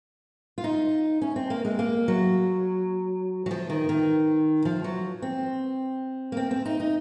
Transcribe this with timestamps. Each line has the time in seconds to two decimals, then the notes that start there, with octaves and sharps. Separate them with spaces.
0.58 F4
0.64 D#4
1.22 C#4
1.36 C4
1.50 A#3
1.65 G#3
1.79 A#3
2.08 F#3
3.46 F#3
3.51 F3
3.70 D#3
3.89 D#3
4.65 F3
4.84 F#3
5.22 C4
6.32 A#3
6.37 C4
6.51 C4
6.65 D#4
6.80 D#4